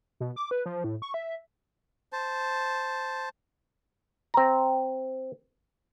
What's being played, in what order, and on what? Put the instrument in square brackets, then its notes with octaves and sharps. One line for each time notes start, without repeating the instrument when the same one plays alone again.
[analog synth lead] B2
D6
B4
F3
A2
C#6
E5
[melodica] C5 A5
[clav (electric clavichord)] C4 A#5